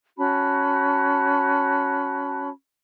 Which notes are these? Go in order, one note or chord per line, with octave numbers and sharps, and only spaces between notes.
C#4 F#4 A5 B5